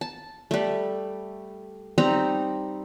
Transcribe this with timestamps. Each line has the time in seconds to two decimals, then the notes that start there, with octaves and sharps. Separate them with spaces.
0.01 A5
0.51 G3 A3
1.98 G3 C4 D#4 A#5